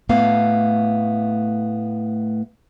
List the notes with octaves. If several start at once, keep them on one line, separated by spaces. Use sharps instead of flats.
A2 A3 B3 F5